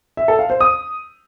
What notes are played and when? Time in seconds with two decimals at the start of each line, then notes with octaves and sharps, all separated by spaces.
0.17 E5
0.28 A4
0.39 F5
0.50 C5
0.61 D#6